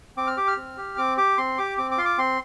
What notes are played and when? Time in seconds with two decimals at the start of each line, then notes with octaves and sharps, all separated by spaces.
0.17 C4 D6
0.27 F6
0.37 G4 D6
0.48 F6
0.57 C4
0.77 G4
0.97 C4 D6
1.17 G4 D6
1.38 C4 C6
1.58 G4 D6
1.78 C4 D6
1.91 D6
1.98 F4 C6
2.05 D6
2.18 C4 C6